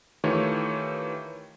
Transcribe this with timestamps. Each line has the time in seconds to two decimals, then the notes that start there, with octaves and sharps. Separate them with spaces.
0.24 D#3 E3 A3 F4 G4 C#5